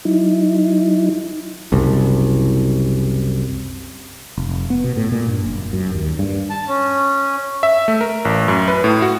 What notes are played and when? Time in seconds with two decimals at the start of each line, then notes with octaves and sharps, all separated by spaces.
0.05 F#3 D#4 E4
1.72 F#1 C2
4.37 F1
4.70 B3
4.84 B2
4.96 A2
5.12 A#2
5.28 G2
5.45 F#1
5.73 F#2
5.95 D#2
6.19 G2
6.50 A5
6.68 C#4
7.63 E5
7.88 A3
8.01 A#4
8.25 A1
8.48 F#2
8.68 B4
8.84 A2
9.02 F#4